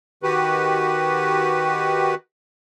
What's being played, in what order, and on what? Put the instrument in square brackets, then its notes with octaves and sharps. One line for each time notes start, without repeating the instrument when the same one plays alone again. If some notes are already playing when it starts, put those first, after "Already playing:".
[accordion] D#3 F#4 G4 B4